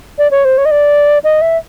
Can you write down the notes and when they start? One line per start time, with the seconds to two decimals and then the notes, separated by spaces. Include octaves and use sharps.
0.18 D5
0.31 C#5
0.45 C5
0.58 C#5
0.65 D#5
0.71 D5
1.24 D#5
1.41 E5